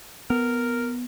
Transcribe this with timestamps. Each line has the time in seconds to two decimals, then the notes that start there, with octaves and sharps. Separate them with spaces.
0.30 B3 A#4